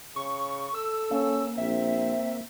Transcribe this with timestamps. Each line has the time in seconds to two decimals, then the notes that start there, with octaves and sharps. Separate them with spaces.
0.16 C#3 C#6
0.75 A4 E6
1.11 A#3 C#4
1.58 A#1 C4 E5